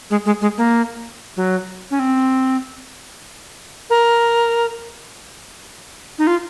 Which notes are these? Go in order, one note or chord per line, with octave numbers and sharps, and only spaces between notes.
G#3
G#3
G#3
A#3
F#3
C#4
C4
A#4
D#4
F4